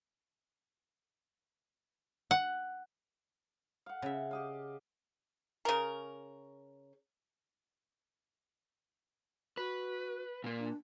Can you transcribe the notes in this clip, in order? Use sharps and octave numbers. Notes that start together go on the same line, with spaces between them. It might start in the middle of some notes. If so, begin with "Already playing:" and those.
F#5
F5 F#5
C#3 E5
G4 D#5 F5
C#3 A#4
F#4 B4
A#2 A#3
D4